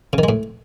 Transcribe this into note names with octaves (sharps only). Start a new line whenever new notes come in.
C#3
D#3
G#3
A2